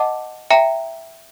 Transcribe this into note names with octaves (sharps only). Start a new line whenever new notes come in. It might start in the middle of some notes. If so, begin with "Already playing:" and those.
Already playing: D#5 F#5 A5 D6
E5 G5 A#5